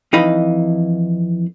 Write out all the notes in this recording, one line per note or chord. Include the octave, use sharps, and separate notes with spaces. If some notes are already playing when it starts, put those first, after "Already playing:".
F2 E3 D#4 D#5 F5 B5